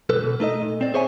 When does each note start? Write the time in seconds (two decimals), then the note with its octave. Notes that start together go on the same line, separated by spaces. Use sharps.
0.10 B1 A4 B4
0.23 B2
0.40 A3 D#4 A4 D#5
0.62 A#2
0.81 C4 D5
0.94 G#4 C5 C#5 E5 G5 G#5